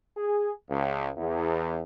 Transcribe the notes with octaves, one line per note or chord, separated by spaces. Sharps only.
G#4
C#2
E2